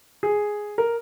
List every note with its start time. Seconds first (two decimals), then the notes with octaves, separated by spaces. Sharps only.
0.23 G#4
0.78 A#4